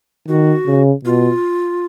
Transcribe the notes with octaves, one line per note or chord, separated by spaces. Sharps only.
D#3 F#4
C#3
B2 F4